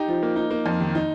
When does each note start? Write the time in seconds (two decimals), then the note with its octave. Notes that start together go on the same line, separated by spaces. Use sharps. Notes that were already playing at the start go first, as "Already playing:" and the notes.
Already playing: D#4 G4
0.08 F3
0.23 A#3
0.36 D#4
0.51 A#3
0.66 F2
0.80 D#3
0.95 D#4